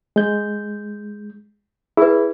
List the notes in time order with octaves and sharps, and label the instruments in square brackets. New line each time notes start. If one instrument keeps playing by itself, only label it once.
[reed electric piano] G#3 G6
[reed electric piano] E4 [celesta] G#4 B4